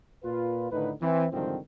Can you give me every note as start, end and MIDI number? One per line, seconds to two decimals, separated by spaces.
0.24 0.68 46
0.24 0.68 65
0.24 0.68 71
0.71 0.91 45
0.71 0.91 50
0.71 0.91 51
0.71 0.91 63
0.71 0.91 71
1.01 1.26 52
1.01 1.26 60
1.32 1.57 36
1.32 1.57 44
1.32 1.57 50
1.32 1.57 51
1.32 1.57 53
1.32 1.57 60